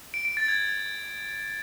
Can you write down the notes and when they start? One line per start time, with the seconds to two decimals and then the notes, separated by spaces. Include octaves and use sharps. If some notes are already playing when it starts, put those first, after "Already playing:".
0.14 D7
0.25 D7
0.37 A6
0.48 G#6